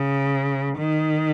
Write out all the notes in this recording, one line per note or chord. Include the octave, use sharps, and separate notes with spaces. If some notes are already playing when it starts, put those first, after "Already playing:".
Already playing: C#3
D#3